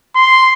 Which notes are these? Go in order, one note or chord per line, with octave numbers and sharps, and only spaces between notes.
C6